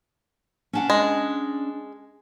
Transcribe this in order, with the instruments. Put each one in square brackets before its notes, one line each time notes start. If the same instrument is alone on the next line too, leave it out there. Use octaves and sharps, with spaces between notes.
[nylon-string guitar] C#4 D4 F#5
[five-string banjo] G#3